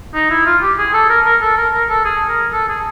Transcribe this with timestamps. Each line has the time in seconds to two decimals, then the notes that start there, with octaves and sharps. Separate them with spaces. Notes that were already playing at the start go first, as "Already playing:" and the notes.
0.14 D#4
0.30 E4
0.46 F4
0.62 G4
0.78 G#4
0.93 A4
1.09 A#4
1.25 A#4
1.41 A4
1.57 A#4
1.73 A#4
1.89 A4
2.05 G#4
2.28 A#4
2.52 A4
2.68 G#4